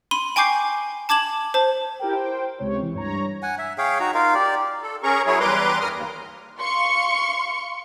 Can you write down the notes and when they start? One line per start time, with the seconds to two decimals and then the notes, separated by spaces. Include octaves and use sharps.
0.11 B5 C6 D#7 G7
0.36 G5 G#5 C#6 D6 G6 C7
1.09 A5 D6 G#6 E7 F#7
1.54 C5 A5
1.99 E4 G4 A#4 G5
2.15 C5 G5
2.59 C#2 C3 C#5
2.81 E3
2.94 G2 C#5 A#5
3.43 F#5 G#5
3.58 E5
3.78 G#4 C#5 F5 G5
4.00 D#4 F#4 A#5
4.14 D#4 F4 A#4 F5
4.34 G4 D5
4.82 A4
5.03 C#4 G#4 A#4 A#5 C#6
5.26 F#3 E4 G#4 C#5
5.40 E2 G3 B4 A#5 C6 D6
5.80 G2 A#4 D#6 F6
5.94 D#2
6.60 F5 C6 C#6 C#7